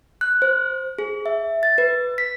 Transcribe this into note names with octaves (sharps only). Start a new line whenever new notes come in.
F#6
C5
G#4
E5
A6
B4
B6